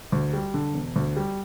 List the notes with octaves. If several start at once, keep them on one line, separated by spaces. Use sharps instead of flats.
D2
G3
D3
E1
D2
G3